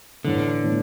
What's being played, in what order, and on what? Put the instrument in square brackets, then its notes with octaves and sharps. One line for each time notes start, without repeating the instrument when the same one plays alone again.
[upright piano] A2 E3 A3 [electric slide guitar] D3
[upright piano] A2 E3 A3